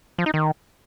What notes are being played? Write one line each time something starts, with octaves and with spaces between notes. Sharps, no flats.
F3
D#4
D#3